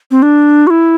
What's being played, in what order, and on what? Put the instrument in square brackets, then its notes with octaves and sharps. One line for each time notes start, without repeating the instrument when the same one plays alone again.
[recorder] C4
D4
F#4
E4